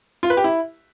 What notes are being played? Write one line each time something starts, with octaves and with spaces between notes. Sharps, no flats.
F4
B4
G4
E4